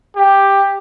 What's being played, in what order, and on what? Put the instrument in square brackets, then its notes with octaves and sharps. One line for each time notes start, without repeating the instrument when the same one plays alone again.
[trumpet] G4